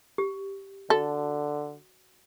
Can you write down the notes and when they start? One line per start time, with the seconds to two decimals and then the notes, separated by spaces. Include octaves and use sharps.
0.18 G4
0.90 D3 F#4 A4